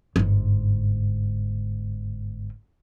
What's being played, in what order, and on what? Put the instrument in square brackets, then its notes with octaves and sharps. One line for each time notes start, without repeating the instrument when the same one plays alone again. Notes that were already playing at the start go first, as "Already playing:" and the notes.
[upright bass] G1 G#2